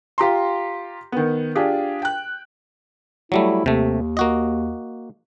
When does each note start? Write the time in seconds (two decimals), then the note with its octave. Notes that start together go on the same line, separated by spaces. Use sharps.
0.18 F4 G4 A#5 C6
1.12 D#3 B3
1.55 D4 F4 G4 G#4
2.02 G5 F#6
3.32 F#3 G3 A3 E4
3.66 D#2 C3 A3
4.17 A#3 F#4 D#5